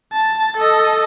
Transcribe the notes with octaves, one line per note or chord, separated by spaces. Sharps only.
A5
A4 D#5